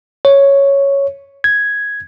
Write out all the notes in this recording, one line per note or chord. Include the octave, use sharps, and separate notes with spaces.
C#5
G#6